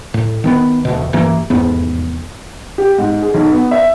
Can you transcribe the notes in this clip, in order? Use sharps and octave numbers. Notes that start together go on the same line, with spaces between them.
A2
D#3 A#3 B3
E1 D2 B2
F#1 G2 E3 A#3
F1 E2 G#2 B3
G4
G#2
G#4
B1
B3
E5